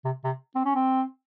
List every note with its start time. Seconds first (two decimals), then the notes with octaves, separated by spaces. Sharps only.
0.05 C3
0.24 C3
0.55 C4
0.66 C#4
0.75 C4